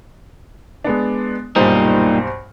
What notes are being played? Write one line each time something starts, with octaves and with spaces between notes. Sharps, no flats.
G#3 B3 D4
B1 G2 A#2 G3 D#4 C5